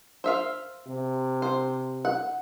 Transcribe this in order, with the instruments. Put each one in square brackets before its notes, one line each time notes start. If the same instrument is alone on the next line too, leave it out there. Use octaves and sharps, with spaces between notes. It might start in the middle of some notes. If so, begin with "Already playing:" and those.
[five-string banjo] C5 E5 F5
[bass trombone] C3
[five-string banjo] C5
F#5